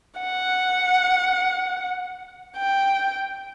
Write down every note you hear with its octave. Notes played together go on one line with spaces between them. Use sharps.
F#5
G5